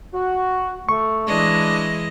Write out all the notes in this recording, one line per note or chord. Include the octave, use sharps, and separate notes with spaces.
F#4
A3 C#6
E3 G#3 D4 D#5